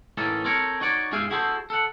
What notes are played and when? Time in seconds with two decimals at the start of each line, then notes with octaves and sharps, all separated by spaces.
0.17 A2 E3 A#3 C#4 D#4 A4
0.45 C4 A4 A#4 C#5
0.81 D#4 F#4 C#5 D5
1.12 G#2 F4 G#4 E5 F5 G5
1.30 E4 F#4 G#4 A4 B4 C5
1.70 A4 F#5